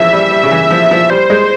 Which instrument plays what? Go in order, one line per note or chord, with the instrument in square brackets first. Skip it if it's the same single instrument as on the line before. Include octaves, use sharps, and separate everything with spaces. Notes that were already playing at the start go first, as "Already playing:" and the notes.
Already playing: [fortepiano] C#3 E3 F3 [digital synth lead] E5
[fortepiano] G3
G3
C#3
E3
F3
F3
[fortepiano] G3 [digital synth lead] C5
[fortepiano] G#3